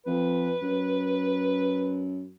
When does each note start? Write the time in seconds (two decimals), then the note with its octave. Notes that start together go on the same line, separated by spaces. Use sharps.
0.06 F2 B4
0.62 F#2